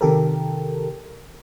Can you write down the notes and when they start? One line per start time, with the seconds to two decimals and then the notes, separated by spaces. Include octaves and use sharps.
0.01 C3 D#3 G4 A4 A#4